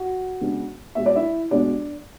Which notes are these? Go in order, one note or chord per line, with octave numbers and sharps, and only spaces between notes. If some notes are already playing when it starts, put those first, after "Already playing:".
Already playing: F#4 F#5
C#3 G#3 B3 D4
B2 G#3 B3 E5
D5
E4 E5
B2 G#3 B3 D4 D5